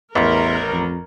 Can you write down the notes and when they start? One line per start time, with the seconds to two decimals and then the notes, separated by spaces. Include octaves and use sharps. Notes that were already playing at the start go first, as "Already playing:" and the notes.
0.15 A1 E2 A#4 E5 C6 B6
0.72 F2 A#5